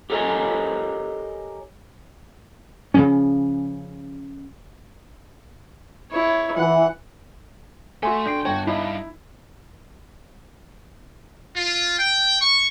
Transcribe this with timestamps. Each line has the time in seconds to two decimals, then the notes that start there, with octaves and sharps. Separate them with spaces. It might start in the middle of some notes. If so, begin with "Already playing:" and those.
0.10 G4 A4 A#4 C#5 D#5 G#5
2.94 C#3 F3 C#4
6.11 E4 C#5
6.57 E3 F#5
8.03 A3 F#4 A4 G#5 C6
8.26 B1 D4 G5 G6 C7
8.45 G1 F#4 C#5 G5 A5
8.67 G2 D#4 E4
11.55 F4
11.98 G5
12.40 C#6